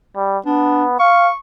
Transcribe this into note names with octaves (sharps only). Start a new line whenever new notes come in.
G3
B3 D4
F5 C#6